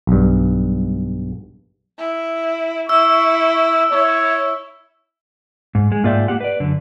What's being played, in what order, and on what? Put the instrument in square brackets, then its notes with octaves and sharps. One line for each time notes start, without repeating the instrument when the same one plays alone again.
[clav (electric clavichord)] B1 G2
[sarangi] E4
[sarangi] E4 [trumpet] C#6 [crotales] E6
[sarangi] E4 [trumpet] C#5
[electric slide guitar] G#2
G#3
G#2 A#3 F4 D5 E5 G5
A#3 G4 F#5
B4 D5
F#2 D3